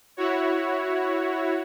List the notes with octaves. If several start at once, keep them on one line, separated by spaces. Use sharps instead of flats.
E4 F#4 C#5